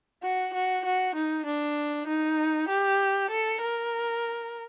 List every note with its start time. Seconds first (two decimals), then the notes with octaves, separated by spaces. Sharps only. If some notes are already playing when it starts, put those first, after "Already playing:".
0.23 F#4
0.54 F#4
0.85 F#4
1.15 D#4
1.46 D4
2.07 D#4
2.68 G4
3.30 A4
3.61 A#4